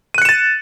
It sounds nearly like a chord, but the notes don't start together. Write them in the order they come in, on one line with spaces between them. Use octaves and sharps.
D#7 F#6 C#7 E7 A6